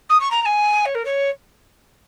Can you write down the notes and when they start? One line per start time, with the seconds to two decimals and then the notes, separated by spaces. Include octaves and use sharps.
0.09 D#6
0.20 C#6
0.31 A#5
0.41 A#5
0.45 G#5
0.85 C#5
0.95 A#4
1.05 C#5